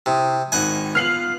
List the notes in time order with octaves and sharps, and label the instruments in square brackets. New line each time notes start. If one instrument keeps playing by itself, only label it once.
[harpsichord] C3 [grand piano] E4 D#6
[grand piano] G#1 D#3 [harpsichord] F#5 G#5
[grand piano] B3 F4 [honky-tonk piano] F6 C7 F#7